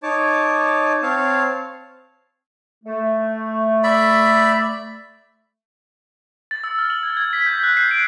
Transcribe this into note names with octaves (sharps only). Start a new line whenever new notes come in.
D#4 C#5 A5 D6
C4 C#5 F5 A5
A3
D5 E5 B5
A6
E6
F6
F#7
G#6
G#6
B6
G6
F#6
C7
D7